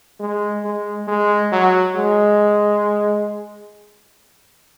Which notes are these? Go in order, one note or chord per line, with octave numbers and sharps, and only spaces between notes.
G#3
G#3
G#3
F#3
G#3